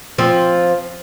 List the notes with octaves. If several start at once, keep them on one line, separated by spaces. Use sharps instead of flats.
F3 C4